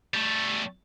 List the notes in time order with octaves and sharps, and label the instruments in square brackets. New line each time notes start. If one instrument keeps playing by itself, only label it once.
[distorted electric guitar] G3 A3